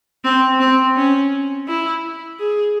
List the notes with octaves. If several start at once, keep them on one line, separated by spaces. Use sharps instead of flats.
C4
C4
C#4
E4
G#4